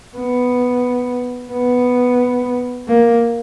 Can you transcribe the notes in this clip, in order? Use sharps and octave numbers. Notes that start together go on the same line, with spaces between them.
B3
B3
A#3